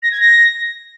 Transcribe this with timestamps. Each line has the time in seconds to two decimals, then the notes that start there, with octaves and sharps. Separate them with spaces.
0.03 A#6
0.12 G#6
0.21 A#6